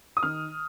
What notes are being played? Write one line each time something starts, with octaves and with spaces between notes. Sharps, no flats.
D#6
D#3 F6